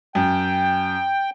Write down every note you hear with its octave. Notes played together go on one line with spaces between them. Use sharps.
F#2 G5